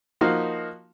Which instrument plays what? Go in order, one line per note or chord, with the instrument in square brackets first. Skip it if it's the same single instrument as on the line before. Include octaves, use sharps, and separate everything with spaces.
[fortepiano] F3 A#3 D#4 F#4 F5